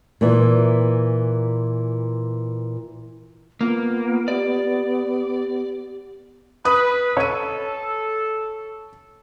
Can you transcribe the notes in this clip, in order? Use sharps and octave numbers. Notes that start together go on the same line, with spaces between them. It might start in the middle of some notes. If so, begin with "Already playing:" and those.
A#2 E3
A#3 B3 F4
G4 D5
B4 D#6
A4 C#5 D#7